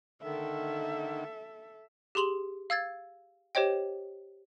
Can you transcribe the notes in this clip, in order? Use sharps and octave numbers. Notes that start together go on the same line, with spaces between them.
D3 D#3 A4 E5
G4 G#4 C6 F7 F#7
F5 E6 G#6 A6
G4 C5 C#5 D#5 G5